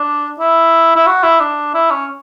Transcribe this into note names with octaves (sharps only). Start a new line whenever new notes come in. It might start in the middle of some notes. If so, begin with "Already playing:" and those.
Already playing: D4
E4
E4
F#4
E4
D4
E4
C#4